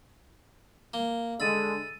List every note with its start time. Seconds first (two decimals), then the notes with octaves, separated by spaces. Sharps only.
0.94 A#3 G7
1.40 D3 G#3 B5 E6 A6 D#7